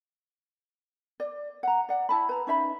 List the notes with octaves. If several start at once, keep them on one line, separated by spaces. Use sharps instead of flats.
D5
F#5 A#5
D5 F#5
E4 A5 B5
B4 A#5
C#4 D#4 E5 B5